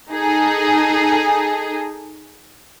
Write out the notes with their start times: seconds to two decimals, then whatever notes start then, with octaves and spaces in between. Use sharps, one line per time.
0.10 D#4 G#4 A4